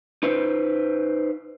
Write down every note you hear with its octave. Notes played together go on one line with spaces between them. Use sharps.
D#4 B4 C5